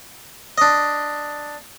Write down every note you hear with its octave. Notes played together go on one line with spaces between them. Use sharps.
D4 D#5